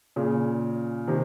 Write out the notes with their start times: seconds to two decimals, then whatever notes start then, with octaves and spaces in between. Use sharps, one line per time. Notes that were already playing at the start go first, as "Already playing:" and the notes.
0.16 A#2 C#3
1.07 C3 D#3